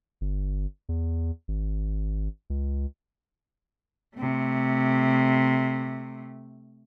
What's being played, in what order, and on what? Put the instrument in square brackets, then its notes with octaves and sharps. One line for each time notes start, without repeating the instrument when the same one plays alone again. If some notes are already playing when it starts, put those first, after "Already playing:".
[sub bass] G1
E2
G#1
C#2
[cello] C3 A3